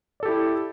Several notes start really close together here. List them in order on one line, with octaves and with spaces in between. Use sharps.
D5 A4 G4 E4